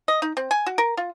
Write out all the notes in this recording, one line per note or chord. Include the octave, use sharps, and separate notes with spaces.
D#5
D#4
C4
G#5
F#4
A#4
F4